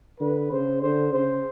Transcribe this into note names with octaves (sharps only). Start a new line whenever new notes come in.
D3 B4
C#3 C5
D3 C5
C#3 C5